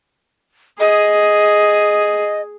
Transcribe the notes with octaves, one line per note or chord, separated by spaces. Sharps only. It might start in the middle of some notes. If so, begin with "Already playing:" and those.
G#4 D#5